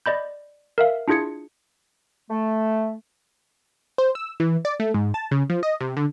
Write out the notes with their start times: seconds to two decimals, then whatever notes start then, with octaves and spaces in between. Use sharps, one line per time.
0.06 D5 D#5 B5 G6
0.78 A#4 E5 F5
1.08 D4 E4 F4 G#4 G#6 C#7
2.29 A3
3.98 C5
4.15 E6
4.40 E3
4.65 D5
4.80 A3
4.94 G#2
5.14 A5
5.31 C#3
5.50 F3
5.63 D#5
5.81 C3
5.97 D3